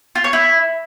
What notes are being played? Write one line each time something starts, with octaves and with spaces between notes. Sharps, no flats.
F4
C#5
E4